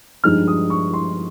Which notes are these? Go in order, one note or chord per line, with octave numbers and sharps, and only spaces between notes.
G2 F3 G#3 D#4 F6
D#6
C#6
C6